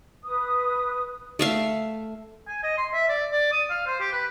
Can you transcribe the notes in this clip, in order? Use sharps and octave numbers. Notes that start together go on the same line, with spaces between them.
B4 D#6
A3 E5 F5
G#5
D#5
C6
E5
D5
D5
D#6
F5
C5
G4
B4